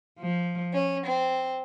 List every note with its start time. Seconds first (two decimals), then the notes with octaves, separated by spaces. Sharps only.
0.18 F3
0.74 C#4
1.05 C4